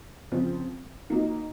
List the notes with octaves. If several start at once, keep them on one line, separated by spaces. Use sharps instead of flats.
C#3 F3 C4
D#3 A#3 D#4 F#4